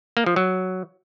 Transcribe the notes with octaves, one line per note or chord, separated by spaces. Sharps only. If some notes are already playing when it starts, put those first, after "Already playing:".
A#3
F3
F#3